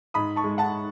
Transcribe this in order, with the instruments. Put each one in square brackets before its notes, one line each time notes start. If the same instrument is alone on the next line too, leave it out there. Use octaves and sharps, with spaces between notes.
[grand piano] G#2 B5 D#6
A5 C#6
G#3
F#5 A5